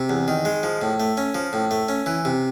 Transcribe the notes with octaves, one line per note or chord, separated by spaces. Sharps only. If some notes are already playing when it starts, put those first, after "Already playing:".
Already playing: C3
E2
D#3
G#3
F3
A2
A3
C#4
F3
A2
A3
C#4
E3
C3